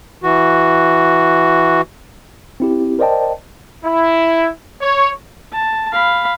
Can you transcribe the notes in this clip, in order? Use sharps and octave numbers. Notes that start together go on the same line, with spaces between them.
E3 F#4
C4 E4 G4
A#4 C5 D5 D#5 G5 A5
E4
C#5
A5
F5 B5